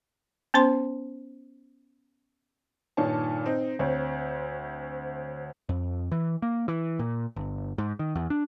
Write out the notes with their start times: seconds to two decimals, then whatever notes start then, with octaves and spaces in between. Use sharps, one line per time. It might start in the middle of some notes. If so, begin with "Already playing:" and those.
0.54 B3 C#4 C5 C6
2.97 G2 A#2 D#3 C#5 A5
3.46 C4 D#4
3.79 D2 C4 C#5
5.69 F2
6.11 E3
6.42 A#3
6.68 E3
6.99 A#2
7.36 G1
7.78 G#2
7.99 D#3
8.15 E2
8.30 D4